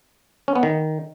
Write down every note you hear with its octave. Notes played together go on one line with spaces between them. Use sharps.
C#4
B3
D#3